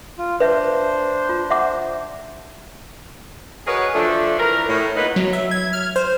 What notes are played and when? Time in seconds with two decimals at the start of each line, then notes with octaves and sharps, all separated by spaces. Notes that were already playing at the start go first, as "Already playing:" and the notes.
0.18 F4
0.40 D4 B4 C5 E5
1.29 F4
1.50 E5 F#5 D6
3.67 F#4 G#4 A#4 B4 C#5 D#5
3.94 F3 A3 D4
4.38 E3 A#4
4.68 A2
4.96 A#3 B3 D#4 F4 B4
5.16 F#3
5.33 E5
5.51 G#6
5.73 F6
5.96 C5